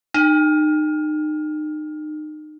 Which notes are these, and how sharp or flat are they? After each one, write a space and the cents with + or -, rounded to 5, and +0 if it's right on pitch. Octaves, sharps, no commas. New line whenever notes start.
D#4 -30